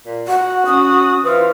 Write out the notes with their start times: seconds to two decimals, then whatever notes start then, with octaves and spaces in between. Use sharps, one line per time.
0.06 A#2
0.28 F#4 F#5
0.66 C#4 D#6
1.24 E3 F4 C5